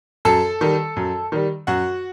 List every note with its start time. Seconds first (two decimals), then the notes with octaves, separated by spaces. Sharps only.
0.25 F#2 A4 A5
0.61 D#3 G3
0.96 F#2
1.32 D#3 G3
1.67 F#2 F#4 F#5